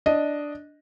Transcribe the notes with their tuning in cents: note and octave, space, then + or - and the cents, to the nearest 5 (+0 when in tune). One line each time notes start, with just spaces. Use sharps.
D4 +0 D#5 +0